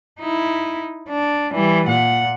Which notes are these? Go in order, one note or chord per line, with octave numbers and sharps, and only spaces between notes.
D#4 E4
D4
E3 G3
A#2 F#5